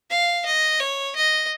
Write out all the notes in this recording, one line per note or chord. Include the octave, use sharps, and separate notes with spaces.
F5
D#5
C#5
D#5